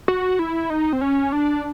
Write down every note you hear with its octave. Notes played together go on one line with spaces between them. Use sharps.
F#4
E4
D#4
C4
C#4
D4